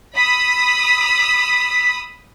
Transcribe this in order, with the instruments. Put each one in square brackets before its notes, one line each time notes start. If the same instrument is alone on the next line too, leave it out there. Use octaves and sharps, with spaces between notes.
[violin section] B5 D#6 E6 [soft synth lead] B6